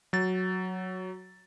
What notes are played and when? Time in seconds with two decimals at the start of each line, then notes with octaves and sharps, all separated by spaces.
0.13 F#3 A6